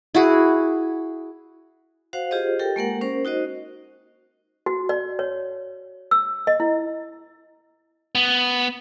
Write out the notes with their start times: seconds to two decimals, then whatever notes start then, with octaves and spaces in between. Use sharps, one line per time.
0.15 E4 F#4 G#4
2.13 F#4 C5 F5 F#5
2.31 F4 G4 G#4 C5 D#5
2.59 G4 A4 A#4 G5
2.76 G#3 A#3 A#4 F#5
3.01 C#4 A#4 C5
3.25 D#4 F#4 C5 D#5
4.66 F#4
4.89 D5
5.19 C#5
6.11 E6
6.47 D#5
6.60 E4
8.15 B3